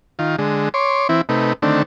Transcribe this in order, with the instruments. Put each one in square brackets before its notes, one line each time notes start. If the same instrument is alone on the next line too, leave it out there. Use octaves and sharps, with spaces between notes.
[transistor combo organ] D#3 F4
D3 G#3
C#5 C6 D6
E3 C4 E4
C3 A3 D#4 B4
D3 D#3 A3 C4 D4